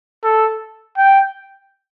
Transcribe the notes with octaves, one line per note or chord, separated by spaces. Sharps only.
A4
G5